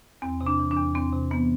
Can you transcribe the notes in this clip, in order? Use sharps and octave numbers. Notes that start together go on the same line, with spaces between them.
E2 C4
C3
D4
E3
D4
E2
E2 C4
C3
E3 B3